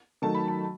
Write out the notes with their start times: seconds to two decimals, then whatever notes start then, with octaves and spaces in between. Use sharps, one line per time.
0.22 D#3 F#3 A3 A5
0.35 B5
0.48 A5